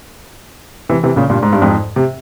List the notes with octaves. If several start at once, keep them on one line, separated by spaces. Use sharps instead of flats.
C3 E3
C3 E3
A#2 C#3
G2 A#2
G#2
G2
F2 G#2
C3